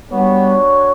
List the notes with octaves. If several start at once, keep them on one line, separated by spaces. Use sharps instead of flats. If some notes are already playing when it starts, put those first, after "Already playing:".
G3 B3 D4 F#4 C#5